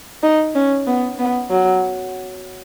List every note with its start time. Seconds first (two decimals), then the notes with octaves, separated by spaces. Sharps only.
0.23 D#4
0.55 C#4
0.87 B3
1.19 B3
1.50 F#3